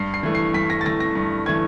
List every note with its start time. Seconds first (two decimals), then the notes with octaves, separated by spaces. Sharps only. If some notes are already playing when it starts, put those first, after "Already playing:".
Already playing: G2 C7
0.14 C7
0.23 E3 A3
0.35 C7
0.54 G2 B6
0.70 A#6
0.81 A6
0.85 E3 A3 A#6
1.00 A#6
1.15 G2
1.46 E3 A3 G#6